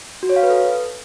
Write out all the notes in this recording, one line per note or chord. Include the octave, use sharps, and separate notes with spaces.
F#4
C#5
F5
B4
A4